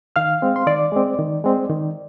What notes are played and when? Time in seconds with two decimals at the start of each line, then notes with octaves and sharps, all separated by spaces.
0.16 D#3 F5 F6
0.42 G#3 C4
0.56 C6
0.67 D#3 D5 D6
0.92 G#3 C4
1.19 D#3
1.44 G#3 C4
1.69 D#3